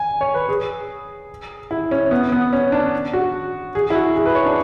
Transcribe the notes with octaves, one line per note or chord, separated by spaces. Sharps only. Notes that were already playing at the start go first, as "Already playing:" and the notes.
Already playing: G#5
C#5
B4
G#4
E4
C#4
B3
B3
C#4
D4
F#4
G#4
E4
F#4
G#4
B4
C#5
D4